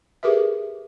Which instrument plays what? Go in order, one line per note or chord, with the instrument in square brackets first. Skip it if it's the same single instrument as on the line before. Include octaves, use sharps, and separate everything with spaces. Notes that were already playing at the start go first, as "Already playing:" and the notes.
[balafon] G4 G#4 A#4 B4 E5